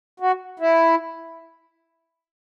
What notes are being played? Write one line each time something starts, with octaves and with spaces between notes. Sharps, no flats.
F#4
E4